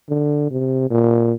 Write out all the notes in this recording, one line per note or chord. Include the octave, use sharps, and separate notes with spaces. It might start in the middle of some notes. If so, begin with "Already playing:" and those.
D3
C3
A#2